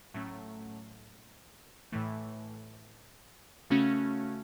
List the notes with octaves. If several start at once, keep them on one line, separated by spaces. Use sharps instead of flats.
A2 F#3 A3 C#4
A2 E3 A3
C#3 A3 C#4 F#4